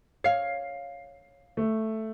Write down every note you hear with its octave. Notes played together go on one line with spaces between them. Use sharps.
C#5 F5 C7
A3